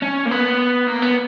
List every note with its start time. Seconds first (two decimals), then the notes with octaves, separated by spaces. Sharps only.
0.02 C#4
0.26 A#3
0.31 B3
0.87 A#3
1.02 B3